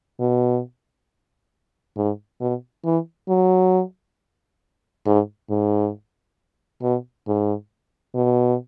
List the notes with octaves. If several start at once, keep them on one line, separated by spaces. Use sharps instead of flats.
B2
G#2
B2
E3
F#3
G#2
G#2
B2
G#2
B2